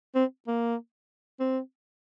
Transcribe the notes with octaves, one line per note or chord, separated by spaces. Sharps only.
C4
A#3
C4